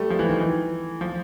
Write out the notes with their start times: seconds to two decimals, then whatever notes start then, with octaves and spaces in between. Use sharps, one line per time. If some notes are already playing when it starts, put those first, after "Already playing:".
Already playing: G3 A3
0.10 F3
0.19 E3
0.29 D#3
0.40 E3
1.01 F3